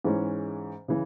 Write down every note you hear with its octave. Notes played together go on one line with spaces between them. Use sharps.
G#2 E3 G#3 C#4
C#3 E3